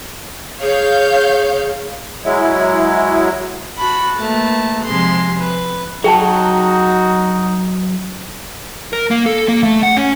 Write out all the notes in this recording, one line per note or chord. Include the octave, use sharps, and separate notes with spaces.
G#4 C#5 F5 G6
F#3 G#3 E4
F#4 A5 B5
A3 A#3 B4 A5
C3 F3 G#3 C6
B4
F#3 D#4 F#4 G#4 G5 A5
A#4
A#3
A4
A#3
A3
F#5
C#4